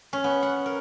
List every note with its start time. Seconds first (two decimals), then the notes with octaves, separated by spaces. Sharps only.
0.13 C#4
0.24 B3
0.43 F#5
0.66 A#4